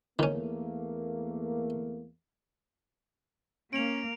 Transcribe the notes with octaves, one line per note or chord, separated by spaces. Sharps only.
E2 D#3 A3 A#3 C#4
A#3 C#4 D7 F7